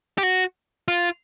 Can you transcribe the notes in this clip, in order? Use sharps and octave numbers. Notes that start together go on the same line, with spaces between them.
G4
F#4
F4